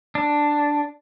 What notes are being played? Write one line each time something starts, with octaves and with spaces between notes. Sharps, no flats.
D4